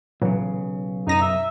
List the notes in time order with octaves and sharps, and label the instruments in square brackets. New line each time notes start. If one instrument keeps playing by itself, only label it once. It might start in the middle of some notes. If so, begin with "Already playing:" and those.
[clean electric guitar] B1 C#3 [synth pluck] A#2 E3 F#3
[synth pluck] F#2 A#6 D#7 [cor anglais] D#4
[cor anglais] E5